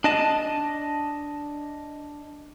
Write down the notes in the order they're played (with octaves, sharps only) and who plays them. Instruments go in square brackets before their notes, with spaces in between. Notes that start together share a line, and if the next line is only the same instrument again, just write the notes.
[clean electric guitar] D4 D#5 A5